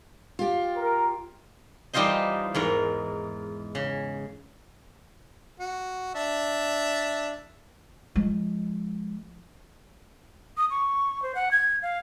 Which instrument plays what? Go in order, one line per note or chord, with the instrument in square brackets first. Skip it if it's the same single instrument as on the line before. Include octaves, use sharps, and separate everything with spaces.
[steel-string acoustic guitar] F4 G4
[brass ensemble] A#4
[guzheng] E3 G3 D#4 F4 C5 D#5
E2 G#2 A#4
C#3
[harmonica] F#4
D4 E5
[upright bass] F3 G#3
[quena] D#6
C#6
C5
F#5
G#6
F5